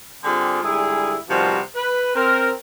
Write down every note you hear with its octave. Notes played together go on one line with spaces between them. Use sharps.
D3 G3 C4 F4 G4 G#4
G#2 D3 G3 E4 G#4
C3 D#3 F3 G3 B3 F#4
B4
C4 A#4